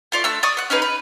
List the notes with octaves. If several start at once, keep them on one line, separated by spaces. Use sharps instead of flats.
A3 F4 D5
A3 D4 E6
D5 C#6 D#6
F#5 F#6
C#4 D#4 G#4 B4
B4